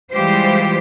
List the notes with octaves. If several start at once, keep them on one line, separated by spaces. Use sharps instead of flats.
E3 G3 G#3 F4 G4 C5